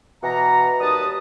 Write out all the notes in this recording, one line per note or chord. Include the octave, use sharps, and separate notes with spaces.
B2 E3 F#5 A#5
D#2 G3 B4 A5 D#6